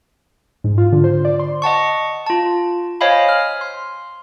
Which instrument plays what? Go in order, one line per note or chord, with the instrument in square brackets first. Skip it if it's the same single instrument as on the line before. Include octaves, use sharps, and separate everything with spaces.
[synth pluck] G#2
F4
D3
C5
D5
C6
[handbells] D#5 F#5 A5 C#6
F4 A5
C5 C#5 D#5 F5 G#5 B5
F6
C6